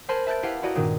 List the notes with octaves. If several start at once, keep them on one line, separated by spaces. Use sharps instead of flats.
A#4 C5 G#5 A5 B5
E5 A5 F#6 G6 A6 D7
E4 G4 B4 F5 F#5
E4 F#4 D5 D#5 A#5
G2 A#2 D#3 G#3